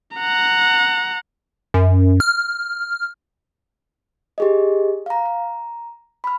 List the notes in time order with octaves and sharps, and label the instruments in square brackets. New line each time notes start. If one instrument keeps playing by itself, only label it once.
[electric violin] F#5 A#5
[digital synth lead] F#2
F6
[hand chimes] G4 G#4 D#5
F5 A#5
A#5
B5 F6